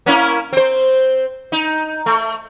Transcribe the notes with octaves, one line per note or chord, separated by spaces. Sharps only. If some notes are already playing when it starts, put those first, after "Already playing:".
A#3 C#4 E4
C4 C5
D#4
A3